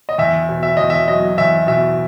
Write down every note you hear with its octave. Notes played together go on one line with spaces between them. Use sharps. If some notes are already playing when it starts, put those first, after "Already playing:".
D#5
E2 E5
B2
E5
E2 D#5
E5
F#3 D#5
E2 E5
B2 E5